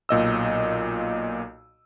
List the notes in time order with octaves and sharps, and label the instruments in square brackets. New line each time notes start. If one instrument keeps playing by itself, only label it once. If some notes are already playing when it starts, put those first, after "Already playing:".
[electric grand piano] B1 A#2 D#5 E6